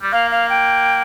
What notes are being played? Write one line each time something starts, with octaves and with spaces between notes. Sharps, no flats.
G3
A#3 F5
F5
G5